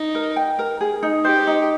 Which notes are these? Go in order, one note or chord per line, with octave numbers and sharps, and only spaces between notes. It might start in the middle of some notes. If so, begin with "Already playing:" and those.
Already playing: D#4
A#4
G5
A#4
G#4
D#4
G4 C5
D#4